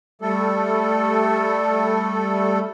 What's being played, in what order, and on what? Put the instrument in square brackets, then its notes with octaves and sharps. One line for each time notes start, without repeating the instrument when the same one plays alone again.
[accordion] G3 A3 A4